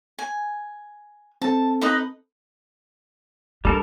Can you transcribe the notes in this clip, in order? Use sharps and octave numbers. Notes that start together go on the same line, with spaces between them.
G#5
C4 A4 A5
D#4 B4 D#5
G3 D4 A4 A#4